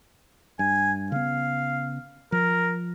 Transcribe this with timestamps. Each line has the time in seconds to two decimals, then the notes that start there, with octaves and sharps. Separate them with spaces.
0.59 G2 G#5
1.12 C#3 B3 F5
2.32 F3 A#4